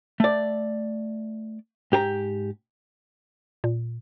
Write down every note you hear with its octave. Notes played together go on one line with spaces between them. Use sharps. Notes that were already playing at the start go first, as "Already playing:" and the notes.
A3 D5
G#2 G4 A4 A#5
A#2